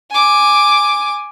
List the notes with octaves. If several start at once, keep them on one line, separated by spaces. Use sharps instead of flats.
G#5 D6